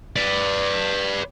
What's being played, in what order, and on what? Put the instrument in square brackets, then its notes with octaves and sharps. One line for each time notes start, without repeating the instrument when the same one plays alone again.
[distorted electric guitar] B4 D5